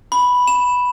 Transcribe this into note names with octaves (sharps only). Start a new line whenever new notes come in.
B5
E7